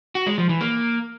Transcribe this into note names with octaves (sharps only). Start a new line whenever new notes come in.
F#4
G#3
F3
E3
A#3